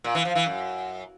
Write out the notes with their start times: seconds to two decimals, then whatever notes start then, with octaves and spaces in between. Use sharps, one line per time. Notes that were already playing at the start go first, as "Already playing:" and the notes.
0.04 A#2
0.15 E3
0.25 F3
0.35 E3
0.46 F#2